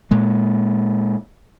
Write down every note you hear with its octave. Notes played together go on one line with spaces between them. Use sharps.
A#2 G#3 A#3